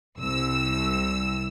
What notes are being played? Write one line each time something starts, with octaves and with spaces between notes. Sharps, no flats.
C2 E6